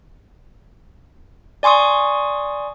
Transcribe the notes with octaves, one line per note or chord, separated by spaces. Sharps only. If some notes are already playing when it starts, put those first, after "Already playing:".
D5 G#5 C6 C#6 D#6